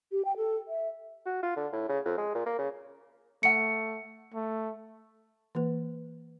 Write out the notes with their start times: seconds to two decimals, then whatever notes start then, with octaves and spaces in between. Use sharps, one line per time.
0.12 G4
0.25 G5
0.37 A4
0.68 E5
1.26 F#4
1.43 F4
1.56 D3
1.73 A2
1.89 C#3
2.05 F2
2.18 G#3
2.35 A#2
2.46 A#3
2.58 C#3
3.43 A3 F#5 C#7
4.34 A3
5.55 E3 A#3 B4